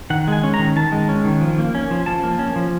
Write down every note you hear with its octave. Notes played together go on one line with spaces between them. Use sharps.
D#3 F#5
G#3 G#5
C#4
A#5
D#3
D#3 A5
G#3
C#4
D#3
F3
A#3
C#4
F3
F3 A5
A#3
C#4
F3